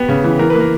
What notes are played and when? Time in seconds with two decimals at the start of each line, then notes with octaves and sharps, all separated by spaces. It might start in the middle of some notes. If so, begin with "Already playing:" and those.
Already playing: B3 G4
0.09 C#3
0.24 E3
0.39 E3 A#4
0.50 A#3 B4
0.60 A#4